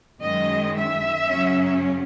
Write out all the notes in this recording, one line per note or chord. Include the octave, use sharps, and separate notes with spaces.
F#2 D#3 G#3 D#5
E5
F#2 C#3 F#3 C#4